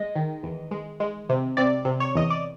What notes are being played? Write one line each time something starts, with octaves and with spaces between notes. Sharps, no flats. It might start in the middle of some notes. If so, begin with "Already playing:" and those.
Already playing: G#3 D#5
D#3
E2
G#3
G#3
C3
C3 D5
C3
C#5
E2 D#5
D5